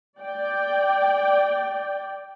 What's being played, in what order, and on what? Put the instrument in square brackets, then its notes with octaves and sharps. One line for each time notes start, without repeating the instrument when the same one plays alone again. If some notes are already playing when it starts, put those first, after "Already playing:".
[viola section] D5 G5